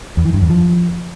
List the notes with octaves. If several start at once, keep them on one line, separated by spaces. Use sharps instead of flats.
E2
E3
G2
E2
F3